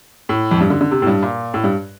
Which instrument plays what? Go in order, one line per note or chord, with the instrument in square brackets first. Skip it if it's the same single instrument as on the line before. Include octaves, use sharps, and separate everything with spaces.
[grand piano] A2
F2
G2
D3
D3
C3
A2
G2
A#2
A2
G2